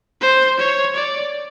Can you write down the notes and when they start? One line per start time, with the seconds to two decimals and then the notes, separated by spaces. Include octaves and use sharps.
0.22 C5
0.59 C#5
0.96 D5